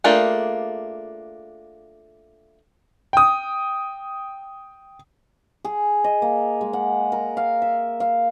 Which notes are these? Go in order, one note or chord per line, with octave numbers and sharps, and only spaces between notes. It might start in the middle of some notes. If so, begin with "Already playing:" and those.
A3 A#3 D4 F4 G#4
G5 D#6
G#4
D#5
A#3
G#3
F#5
A#4
F5
E5
F5